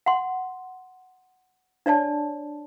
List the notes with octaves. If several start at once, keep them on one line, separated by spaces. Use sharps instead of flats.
F#5 C6
D4 C#5 D5 A5